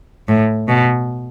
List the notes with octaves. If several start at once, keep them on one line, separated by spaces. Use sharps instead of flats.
A2
B2